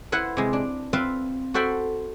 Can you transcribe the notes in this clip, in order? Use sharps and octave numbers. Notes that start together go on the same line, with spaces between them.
E4 B4 C5 F#5
C3 G#3
D4
C4 F4 B4 E5 F5 C6
F#4 A4 C5 E5 G5 B5